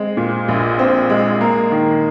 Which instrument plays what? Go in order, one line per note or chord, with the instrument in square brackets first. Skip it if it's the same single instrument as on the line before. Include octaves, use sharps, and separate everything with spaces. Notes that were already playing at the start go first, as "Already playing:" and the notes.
Already playing: [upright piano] G#3 C4
A#2
A#1
C4
G#3
A#3
D#3